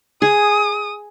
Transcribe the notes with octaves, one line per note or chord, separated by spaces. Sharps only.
G#4 D#6